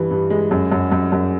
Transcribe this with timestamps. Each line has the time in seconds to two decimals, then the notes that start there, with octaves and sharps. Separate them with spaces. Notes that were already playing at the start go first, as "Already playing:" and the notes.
Already playing: G2 E3
0.11 G2
0.30 G#3
0.51 F#2
0.72 F#2
0.92 F#2
1.12 F#2